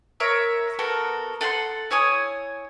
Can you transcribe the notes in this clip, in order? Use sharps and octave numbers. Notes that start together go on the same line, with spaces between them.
A#4 C#5 E5 A#5
B3 F#4 A4 A#4
A4 F#5 G5 C6
E4 C#5 G#5 D#6